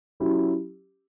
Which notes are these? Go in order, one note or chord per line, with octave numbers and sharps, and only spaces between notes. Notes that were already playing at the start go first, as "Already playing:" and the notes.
F#3 C#4 E4 G4